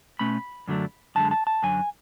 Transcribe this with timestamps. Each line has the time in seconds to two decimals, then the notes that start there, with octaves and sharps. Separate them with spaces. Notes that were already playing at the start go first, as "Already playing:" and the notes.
0.19 B2 A3 C#4 B5
0.68 F#2 D3 F#3 A3 D4
1.15 F#2 D3 G#3 A5
1.31 A5
1.47 A5
1.63 F#2 D3 F#3 G#5